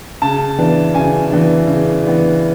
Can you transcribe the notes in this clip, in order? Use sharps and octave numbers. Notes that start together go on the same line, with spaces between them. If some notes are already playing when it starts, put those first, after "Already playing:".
C#3 A5
E3 B3 D4
C#3 G#5
E3 B3 D4
C#3
E3 B3 D4